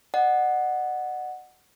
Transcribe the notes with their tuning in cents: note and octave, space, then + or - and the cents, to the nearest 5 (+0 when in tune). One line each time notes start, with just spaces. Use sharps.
D#5 -45 F#5 +0